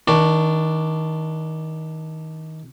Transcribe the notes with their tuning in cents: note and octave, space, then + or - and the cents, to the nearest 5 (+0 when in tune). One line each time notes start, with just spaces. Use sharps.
D#3 +25 D4 +0